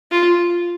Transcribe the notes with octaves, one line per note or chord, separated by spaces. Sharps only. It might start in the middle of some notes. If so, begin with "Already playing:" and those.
F4